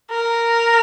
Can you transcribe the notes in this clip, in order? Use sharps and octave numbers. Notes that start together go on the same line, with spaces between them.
A#4